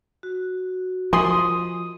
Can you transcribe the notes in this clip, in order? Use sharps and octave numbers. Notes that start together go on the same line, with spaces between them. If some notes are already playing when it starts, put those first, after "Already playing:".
F#4
F3 G#5 C6 D#6